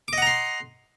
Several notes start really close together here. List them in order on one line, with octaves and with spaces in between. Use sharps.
D6 D#5 F#5 A#5 C6